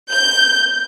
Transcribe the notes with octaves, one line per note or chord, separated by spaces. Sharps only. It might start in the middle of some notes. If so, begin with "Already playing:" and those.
G6